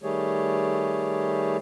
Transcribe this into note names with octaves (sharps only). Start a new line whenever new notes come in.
D#3 G3 A3 G4 G#4 C#5